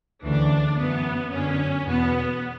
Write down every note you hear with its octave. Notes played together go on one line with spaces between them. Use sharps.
D2 C#3 E3 D4
F#2 E3 B3
F#2 D3 C#4
E2 B2 B3